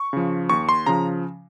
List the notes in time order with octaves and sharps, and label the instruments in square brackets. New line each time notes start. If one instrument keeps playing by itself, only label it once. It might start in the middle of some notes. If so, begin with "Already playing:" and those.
Already playing: [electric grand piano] C#6
C#3 F3
D#2 C#6
C6
C#3 F3 A#5